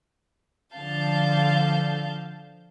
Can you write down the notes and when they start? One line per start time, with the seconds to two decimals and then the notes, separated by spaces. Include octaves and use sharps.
0.74 D3 F3 F5 A5 G6